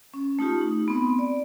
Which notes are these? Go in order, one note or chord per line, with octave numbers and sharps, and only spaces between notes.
C#4
A3 D#4 F4 G4
D#4
B3 C4 B5
D5